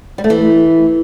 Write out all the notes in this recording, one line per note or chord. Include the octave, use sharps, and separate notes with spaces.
G3
A3
E3